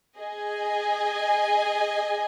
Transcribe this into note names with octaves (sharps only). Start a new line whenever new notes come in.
G#4 D#5 G#5